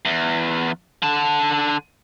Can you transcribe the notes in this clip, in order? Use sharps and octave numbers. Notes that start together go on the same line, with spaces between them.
E2
D3 A5